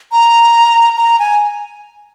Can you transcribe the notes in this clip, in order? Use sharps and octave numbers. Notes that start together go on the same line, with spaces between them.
A#5
A#5
G#5